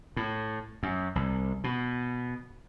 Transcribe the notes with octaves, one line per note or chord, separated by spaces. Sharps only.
A2
F#2
C2
B2